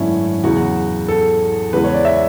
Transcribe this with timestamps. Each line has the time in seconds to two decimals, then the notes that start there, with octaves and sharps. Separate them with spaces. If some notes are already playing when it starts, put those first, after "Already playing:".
Already playing: G#1 F#2 D3 A3 C#4 D4 E4
0.43 E2 C#3 F#3 F#4
1.08 A4
1.73 E2 C#3 G#3 B4
1.84 C#5
1.94 D5
2.05 E5